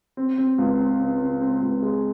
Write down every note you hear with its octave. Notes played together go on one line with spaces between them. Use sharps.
C4
C4
C#2
C4
C#3
C#3
C4
C#2
G#3